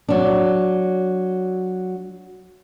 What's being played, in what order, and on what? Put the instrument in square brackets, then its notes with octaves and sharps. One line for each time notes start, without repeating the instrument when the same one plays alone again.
[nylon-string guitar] F#3 D4